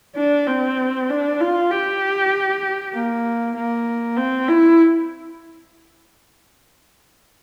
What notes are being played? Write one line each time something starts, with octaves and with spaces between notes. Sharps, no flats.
D4
C4
D4
F4
G4
A#3
A#3
C4
E4